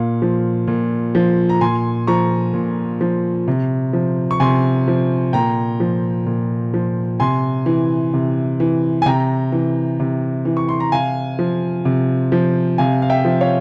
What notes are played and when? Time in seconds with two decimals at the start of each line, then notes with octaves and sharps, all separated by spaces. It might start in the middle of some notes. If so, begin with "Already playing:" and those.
Already playing: A#2 F5
0.22 F3
0.67 A#2
1.15 F3
1.49 A#5
1.61 A#2 G#5 C6
2.07 F3 A#5 C#6
2.54 A#2
3.01 F3
3.48 C3
3.93 F3
4.31 C#6
4.40 C3 G#5 C6
4.88 F3
5.33 A#2 G5 A#5
5.80 F3
6.26 A#2
6.74 F3
7.20 C3 G#5 C6
7.66 E3
8.14 C3
8.60 E3
9.02 G#5
9.06 C3 G5 A#5
9.52 E3
10.00 C3
10.45 E3
10.57 C#6
10.69 C6
10.80 A#5
10.92 C3 F5 G#5
11.39 F3
11.85 C3
12.32 F3
12.78 C3 F5 G#5
13.02 F5
13.10 E5 G5
13.25 F3
13.41 C#5 F5